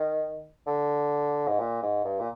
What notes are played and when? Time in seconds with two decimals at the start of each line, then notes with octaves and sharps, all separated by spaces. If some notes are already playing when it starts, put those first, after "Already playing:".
Already playing: D#3
0.67 D3
1.48 G#2
1.60 A#2
1.83 G#2
2.05 G2
2.20 A#2